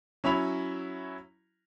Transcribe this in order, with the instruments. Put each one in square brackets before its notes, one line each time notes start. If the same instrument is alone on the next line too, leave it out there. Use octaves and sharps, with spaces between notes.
[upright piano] F#3 C#4 E4 B5 F7